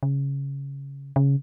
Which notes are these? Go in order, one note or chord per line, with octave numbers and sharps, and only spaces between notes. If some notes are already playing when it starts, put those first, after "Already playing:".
C#3
C#3